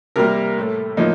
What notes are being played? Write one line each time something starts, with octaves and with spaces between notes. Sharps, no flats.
C3 G3 A#3 A#4
A2 A3
A2 F3 A#3 D#4